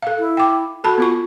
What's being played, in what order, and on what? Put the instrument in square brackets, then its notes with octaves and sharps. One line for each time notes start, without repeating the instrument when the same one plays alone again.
[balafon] A4 F5
[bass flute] E4
[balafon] G5 D6
[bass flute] F#4 [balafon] A4 A5 B5
[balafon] B3 F4 C#6